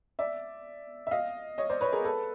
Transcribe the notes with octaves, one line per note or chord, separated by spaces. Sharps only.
D5 E5
E5
D#5 F5
C#5 D#5
C5 D5
B4 C#5
G#4 A#4
A4 B4